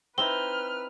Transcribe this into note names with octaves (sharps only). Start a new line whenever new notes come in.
C4 D#4 E4 B4 F6 G7